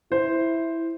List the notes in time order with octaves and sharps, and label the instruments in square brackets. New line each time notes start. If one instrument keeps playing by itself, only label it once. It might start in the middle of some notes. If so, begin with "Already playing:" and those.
[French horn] E4 [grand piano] C5